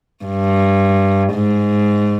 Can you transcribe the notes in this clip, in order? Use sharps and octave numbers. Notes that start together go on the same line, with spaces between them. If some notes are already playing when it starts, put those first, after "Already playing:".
G2
G#2